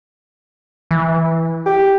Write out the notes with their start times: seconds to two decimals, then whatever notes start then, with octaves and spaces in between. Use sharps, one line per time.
0.91 E3
1.66 G4